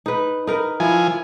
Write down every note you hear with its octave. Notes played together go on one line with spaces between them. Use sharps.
D#4 B4
D#4 A#4 B4
F3 E4 G#5